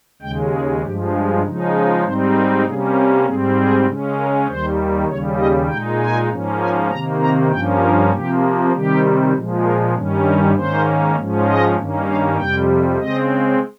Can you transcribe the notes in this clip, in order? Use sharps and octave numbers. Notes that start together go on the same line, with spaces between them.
D#2 C#3 G#3 G5
G#4
G2 F3 G#3 G4
C#3 F3 G#3 D#4
G#2 G3 C4 D#4 C5
A#4
C3 G3 A#3 C#4 G#4
G4
G#2 G3 C4 G#4
G#4
C#3 G#3 C#4
A#4
D#2 D#3 G3 C5
D#2 C#3 G3 C#5
D#5
A#2 G#3 D#4 G5
G#5
G#2 F3 A#3 C#4
G#5
C3 D#3 A#3 A#5
A#5
G2 F3 A#3 C#4 G5
A#4
C3 F3 A#3 G4
C3 D#3 G3 G4
A#2 F3 G#3
A#4
G2 D#3 G3 C#4
A#4
G#2 D#3 A#3 C#4 C5
G#2 F3 G#3 C#4
D#5
G2 D#3 A#3 C#4
F5
F2 C3 G3 G5
C#3 G#3 C4 D#5